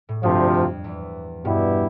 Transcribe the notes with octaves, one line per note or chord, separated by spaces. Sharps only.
A2
D2 G2 C3 F3
F2
E2
G2 B2 G3 B3 E4 G4